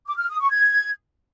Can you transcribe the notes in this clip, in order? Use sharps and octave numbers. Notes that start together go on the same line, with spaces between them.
D6
F6
D#6
C#6
G#6